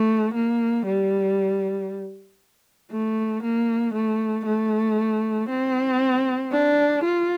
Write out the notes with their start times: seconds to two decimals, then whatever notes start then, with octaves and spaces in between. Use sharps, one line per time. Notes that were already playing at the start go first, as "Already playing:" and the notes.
Already playing: A3
0.35 A#3
0.86 G3
2.91 A3
3.44 A#3
3.94 A3
4.46 A3
5.50 C4
6.52 D4
7.04 F4